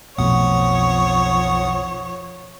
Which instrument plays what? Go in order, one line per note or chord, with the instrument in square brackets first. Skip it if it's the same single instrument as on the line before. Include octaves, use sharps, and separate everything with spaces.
[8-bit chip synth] B1 F#5 D#6 [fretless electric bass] F2 B2 A3 [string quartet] F3 C#5